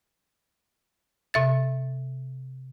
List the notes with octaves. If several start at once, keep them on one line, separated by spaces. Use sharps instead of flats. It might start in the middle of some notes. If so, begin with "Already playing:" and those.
C3 E5 A6